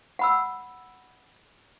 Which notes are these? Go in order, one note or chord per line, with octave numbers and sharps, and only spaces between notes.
F#5 B5 E6